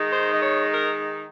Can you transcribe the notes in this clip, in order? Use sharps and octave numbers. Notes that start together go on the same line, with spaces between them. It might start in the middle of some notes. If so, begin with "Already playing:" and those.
Already playing: D#3 G#3 D#4
C5
D#5
C#5
A#4